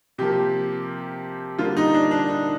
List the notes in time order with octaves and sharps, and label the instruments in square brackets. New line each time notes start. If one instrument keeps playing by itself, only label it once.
[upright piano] C3 F3 A#3 G4
D3 G3 A#3 F4
D#4
D4
D4
D#4